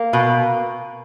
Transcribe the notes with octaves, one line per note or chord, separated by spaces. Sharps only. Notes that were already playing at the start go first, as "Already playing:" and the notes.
Already playing: A#3
B2